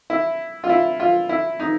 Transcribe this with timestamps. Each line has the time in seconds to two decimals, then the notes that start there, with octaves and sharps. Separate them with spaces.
0.10 E4
0.64 F4
0.69 E4
1.00 F4
1.29 E4
1.60 D#4